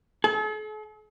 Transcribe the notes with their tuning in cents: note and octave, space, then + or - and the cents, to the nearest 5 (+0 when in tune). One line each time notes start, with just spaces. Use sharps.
A4 -45